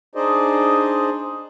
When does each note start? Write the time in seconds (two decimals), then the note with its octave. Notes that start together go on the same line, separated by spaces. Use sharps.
0.15 D4 D#4 G#4 C5 D5 D#5